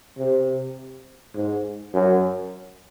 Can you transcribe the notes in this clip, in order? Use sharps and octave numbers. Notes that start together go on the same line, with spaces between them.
C3
G#2
F#2